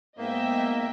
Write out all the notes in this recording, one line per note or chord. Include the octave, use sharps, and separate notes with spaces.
G#2 A#3 B3 D#5 E5 G5